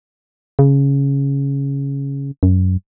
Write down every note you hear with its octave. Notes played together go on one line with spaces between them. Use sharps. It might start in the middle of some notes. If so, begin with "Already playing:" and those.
C#3
F#2